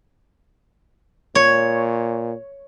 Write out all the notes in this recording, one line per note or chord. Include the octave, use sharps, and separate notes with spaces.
A#2 C#5